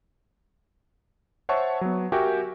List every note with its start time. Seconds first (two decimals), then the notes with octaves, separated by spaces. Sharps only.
1.49 C5 C#5 E5 F#5 A5 C#6
1.81 F#3 B3
2.12 F#4 G4 A#4 E5 G5 G#5